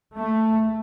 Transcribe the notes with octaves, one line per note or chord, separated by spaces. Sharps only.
A3